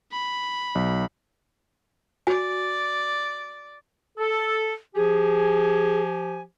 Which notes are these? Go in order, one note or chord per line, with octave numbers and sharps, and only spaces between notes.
B5
B1
F#4 D5 G#5
A4
F3 G4 G#4 G#5